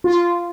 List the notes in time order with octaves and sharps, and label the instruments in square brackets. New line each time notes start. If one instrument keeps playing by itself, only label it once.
[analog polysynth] F4